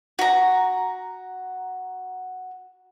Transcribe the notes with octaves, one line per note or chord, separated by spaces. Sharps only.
F#4 A#5